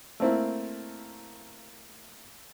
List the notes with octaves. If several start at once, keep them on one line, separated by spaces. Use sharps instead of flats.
A3 A#3 C4 E4